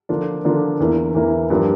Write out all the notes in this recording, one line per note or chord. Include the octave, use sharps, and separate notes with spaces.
D3 F3 A#3 D4 F4
D3 F3 A#3 D4 F4
E2 E3 A#3 E4
E2 E3 A#3 E4
G2 F3 A#3 D4 F4